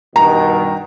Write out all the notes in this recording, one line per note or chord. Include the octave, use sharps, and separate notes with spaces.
G2 B2 D#3 A#5